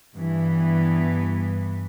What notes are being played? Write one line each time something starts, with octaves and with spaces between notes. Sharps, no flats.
G2 E3 B3